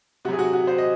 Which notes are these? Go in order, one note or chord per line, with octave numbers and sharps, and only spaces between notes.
C3 F#3 F#4 G#4
F#4
F#4
C5
D#5